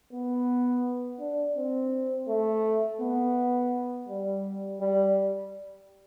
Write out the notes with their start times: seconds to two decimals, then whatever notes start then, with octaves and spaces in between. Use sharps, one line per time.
0.13 B3
1.20 D4
1.57 C4
2.29 A3
3.01 B3
4.09 G3
4.81 G3